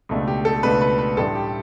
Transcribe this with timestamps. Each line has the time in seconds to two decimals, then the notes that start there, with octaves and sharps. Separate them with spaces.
0.09 C#2 B2 A3 D4
0.28 G4
0.45 A4
0.63 C#2 B2 A3 D4 B4
0.81 B4
0.99 B4
1.17 A1 A2 G3 D4 A4
1.35 G4